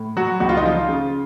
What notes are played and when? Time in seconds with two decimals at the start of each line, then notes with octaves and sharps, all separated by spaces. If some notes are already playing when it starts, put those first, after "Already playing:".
Already playing: A2
0.17 F#3 F#4
0.40 C#2 F#4
0.49 F4
0.57 D#4
0.64 F3 F4
0.88 C#3